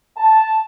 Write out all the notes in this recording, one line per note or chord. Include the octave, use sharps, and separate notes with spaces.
A5